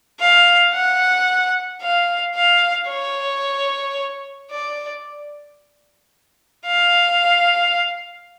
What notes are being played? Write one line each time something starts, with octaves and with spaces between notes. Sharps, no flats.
F5
F#5
F5
F5
C#5
D5
F5